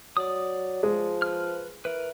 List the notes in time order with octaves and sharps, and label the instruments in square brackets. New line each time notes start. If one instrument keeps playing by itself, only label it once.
[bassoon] F#3 [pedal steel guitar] D5 D#6
[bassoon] F3 [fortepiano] G#3
[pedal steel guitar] B4 F6
[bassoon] E3 [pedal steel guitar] A#4 B4